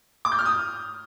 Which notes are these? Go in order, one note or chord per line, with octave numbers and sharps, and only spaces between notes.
D6
G6
F6
D#6